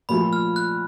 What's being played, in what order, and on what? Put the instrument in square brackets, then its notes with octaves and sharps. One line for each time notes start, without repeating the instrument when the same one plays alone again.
[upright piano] A#2 F3 A3 [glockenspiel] B5
[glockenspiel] F6
F#6